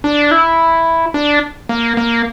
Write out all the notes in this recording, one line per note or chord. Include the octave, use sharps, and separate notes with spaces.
D4
E4
D4
A#3
A#3